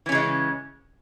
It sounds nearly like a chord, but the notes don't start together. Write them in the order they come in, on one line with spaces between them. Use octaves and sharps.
E3 C#4 C#3 G#3